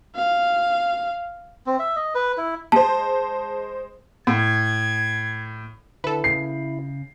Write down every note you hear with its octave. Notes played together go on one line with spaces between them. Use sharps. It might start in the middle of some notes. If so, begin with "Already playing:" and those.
F5
C4
E5
D#5
B4
E4
G#3 C5 A5
A2 G#6
D3 E4 A4 B4
C#3 C7